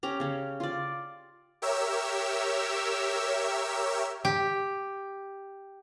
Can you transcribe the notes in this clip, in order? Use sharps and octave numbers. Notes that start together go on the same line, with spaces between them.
C#4 G4 A#5
C#3 C#4
F4 D5
G4 A#4 C#5 E5 E6
G4